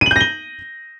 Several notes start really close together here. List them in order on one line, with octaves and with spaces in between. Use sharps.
D#7 F#7 G6 A#6 G7